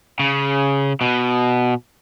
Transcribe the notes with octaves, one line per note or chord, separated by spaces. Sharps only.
C#3
B2